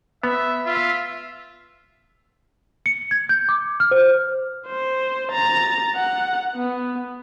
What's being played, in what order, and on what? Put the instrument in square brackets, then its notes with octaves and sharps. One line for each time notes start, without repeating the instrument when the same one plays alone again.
[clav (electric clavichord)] B3 [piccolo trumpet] E5
[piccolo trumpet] F4 [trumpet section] E5
[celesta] C#7
G#6
G6
D6
F6
C5
[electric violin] C5
A#5 A6
F#5
B3